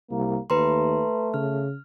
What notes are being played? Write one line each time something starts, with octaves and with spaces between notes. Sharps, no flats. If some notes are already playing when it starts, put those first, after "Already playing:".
C2 A#3
D#2 A3 B4 A#5 C6
C#3 F6